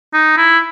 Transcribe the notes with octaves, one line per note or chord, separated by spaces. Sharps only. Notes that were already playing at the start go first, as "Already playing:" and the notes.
D#4
E4